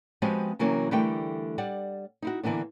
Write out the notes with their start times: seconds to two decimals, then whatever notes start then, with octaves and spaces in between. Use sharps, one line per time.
0.22 F3 G#3 B3 C4 F#4 G4
0.59 C3 E3 F#3 A#3 C#4
0.91 D3 E3 G3 A3 A#4 G5
1.58 G3 D5 F#5
2.22 D#4 E4 F#4
2.43 D3 E3 A#3 B3 D4